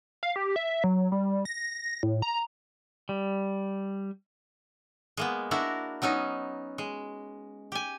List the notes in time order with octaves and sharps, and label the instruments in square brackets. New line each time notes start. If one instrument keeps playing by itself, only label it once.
[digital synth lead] F5
G4
E5
F#3
G3
A#6
A2
A#5
[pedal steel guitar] G3
[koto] G#3 A#3 B3
D4 E4 F#4 A#4
F#3 B3 C#4 D#4
G#3
G4 G#5